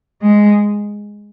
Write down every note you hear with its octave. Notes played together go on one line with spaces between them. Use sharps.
G#3